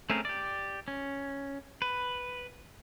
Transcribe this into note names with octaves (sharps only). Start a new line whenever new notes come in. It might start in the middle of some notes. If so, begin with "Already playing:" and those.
A3 C4 C#4 G#4 A#4
G4 D5
C#4
B4